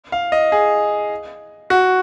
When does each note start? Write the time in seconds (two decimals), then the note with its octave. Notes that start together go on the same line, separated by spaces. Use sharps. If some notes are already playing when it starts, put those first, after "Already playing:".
0.12 F5
0.32 D#5
0.52 G#4
1.70 F#4